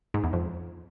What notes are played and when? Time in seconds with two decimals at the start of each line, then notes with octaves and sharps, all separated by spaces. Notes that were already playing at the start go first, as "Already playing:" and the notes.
0.14 G#2
0.24 E2
0.33 F2